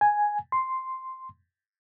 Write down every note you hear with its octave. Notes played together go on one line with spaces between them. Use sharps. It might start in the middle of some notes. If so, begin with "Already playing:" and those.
G#5
C6